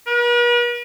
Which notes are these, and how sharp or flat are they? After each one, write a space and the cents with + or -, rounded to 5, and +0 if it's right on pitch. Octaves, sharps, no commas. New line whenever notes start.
B4 -45